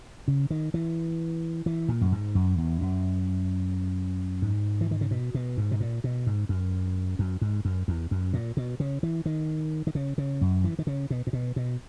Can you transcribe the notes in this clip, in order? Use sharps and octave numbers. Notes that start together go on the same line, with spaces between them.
C#3
D#3
E3
E3
A#2
F#2
G#2
F#2
E2
F#2
G#2
E3
D#3
C#3
B2
B2
G#2
B2
A#2
B2
G#2
F#2
F#2
G#2
F#2
E2
F#2
A#2
B2
C#3
E3
D#3
D#3
C#3
C#3
F#2
E3
D#3
C#3
B2
A#2
B2
B2